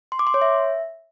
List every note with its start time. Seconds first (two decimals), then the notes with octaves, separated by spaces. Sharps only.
0.12 C6
0.19 D6
0.27 C6
0.34 C#5
0.42 E5